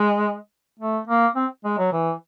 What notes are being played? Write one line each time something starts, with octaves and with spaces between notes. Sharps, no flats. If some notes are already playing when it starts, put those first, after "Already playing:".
Already playing: G#3
A3
A#3
C4
G#3
F#3
E3